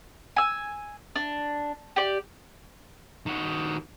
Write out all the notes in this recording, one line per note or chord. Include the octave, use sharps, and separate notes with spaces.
G#5 E6
D4
G4 D5
D#3 F#4